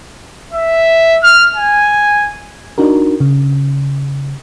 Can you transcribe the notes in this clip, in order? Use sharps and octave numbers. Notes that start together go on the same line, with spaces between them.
E5
F6
G#5
D4 D#4 F#4 A#4
C#3